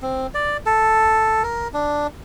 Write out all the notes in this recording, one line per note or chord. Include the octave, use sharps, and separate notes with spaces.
C4
D5
A4
A#4
D4